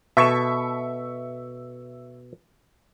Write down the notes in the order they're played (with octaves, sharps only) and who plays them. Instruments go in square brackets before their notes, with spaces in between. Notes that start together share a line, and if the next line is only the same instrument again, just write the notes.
[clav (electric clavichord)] B2 A4 [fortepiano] E5 C#6